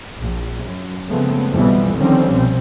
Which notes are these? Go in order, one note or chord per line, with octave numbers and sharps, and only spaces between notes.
A#1
F#2
C#3 F3 G#3 A3 B3 C4
B1 F2 B2 E3 G3 B3
D3 D#3 F3 G3 C4 C#4
C2 B2 C4